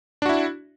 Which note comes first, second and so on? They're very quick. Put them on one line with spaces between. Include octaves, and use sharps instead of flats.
D4 F#4 E4